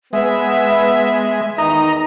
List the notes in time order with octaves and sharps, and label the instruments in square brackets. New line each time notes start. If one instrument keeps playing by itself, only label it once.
[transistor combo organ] G#3 [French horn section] B3 [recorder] E5
[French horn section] E2 D#3 D#4 [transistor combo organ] D#5 A#5